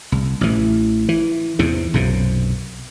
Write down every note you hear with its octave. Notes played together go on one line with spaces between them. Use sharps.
C2
A1 E3
E3
E2 G#2 C3
B1 F#2 C3